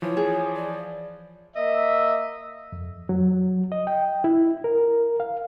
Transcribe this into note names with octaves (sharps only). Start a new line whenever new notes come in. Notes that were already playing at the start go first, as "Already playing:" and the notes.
E3 F3 C#5
G#4
D5
A#3 D#5 E5
F2
F#3
D#5
G5
E4
A#4
F5